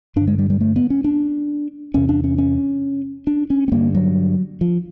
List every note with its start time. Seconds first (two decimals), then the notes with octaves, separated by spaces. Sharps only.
0.16 G2 D4
0.21 D3
0.28 G#3
0.39 G3
0.50 G3
0.61 A3
0.76 B3
0.90 C#4
1.04 D4
1.94 E2 C3 C#4
2.09 D4
2.24 C#4
2.38 C#4
3.27 D4
3.50 C#4
3.68 B3
3.72 G2 D3 A#3
3.95 F#3
4.61 F3